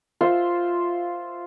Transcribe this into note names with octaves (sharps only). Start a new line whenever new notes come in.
F4 C5 E5